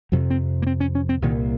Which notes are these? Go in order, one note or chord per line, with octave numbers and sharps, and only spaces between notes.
F2 C3 F#3
C4
A#3
C4
C#4
C#4
C4
C2 A#2 D#3